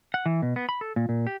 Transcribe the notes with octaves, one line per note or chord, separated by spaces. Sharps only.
F#5
E3
B2
B3
B5
A4
A#2
A#2
G4